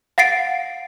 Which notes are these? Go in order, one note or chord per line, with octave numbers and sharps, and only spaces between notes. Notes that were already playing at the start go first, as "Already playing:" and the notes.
F5 F#5 A6 C7 D7